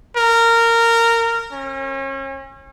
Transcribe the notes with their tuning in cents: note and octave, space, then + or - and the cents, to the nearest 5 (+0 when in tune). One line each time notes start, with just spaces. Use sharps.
A#4 -15
C#4 -35